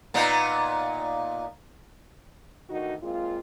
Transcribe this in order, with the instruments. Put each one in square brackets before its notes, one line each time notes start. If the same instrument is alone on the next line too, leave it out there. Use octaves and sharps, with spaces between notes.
[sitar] A#2 B3 D#4
[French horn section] D2 D#3 D#4 F#4
A#2 G#3 C4 F4